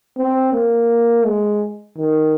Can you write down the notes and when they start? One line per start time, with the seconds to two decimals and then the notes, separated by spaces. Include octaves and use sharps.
0.18 C4
0.53 A#3
1.26 G#3
1.98 D#3